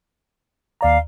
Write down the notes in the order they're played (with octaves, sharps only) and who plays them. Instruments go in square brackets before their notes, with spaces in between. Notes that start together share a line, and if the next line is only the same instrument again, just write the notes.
[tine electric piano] D#2 D5 A#5 [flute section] F5